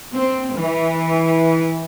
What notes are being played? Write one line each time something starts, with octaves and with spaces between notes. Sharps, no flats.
C4
E3